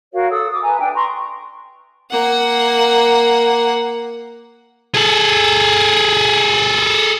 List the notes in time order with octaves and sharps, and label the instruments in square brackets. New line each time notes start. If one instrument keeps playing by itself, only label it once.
[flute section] F#4 A#4 C#5 F5
A4 D#6 E6
D6 D#6
B4 E5 G#5 A#5
D4 G5
A#5 C6 C#6
[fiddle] A#3 F#5
[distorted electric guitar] G#4 A4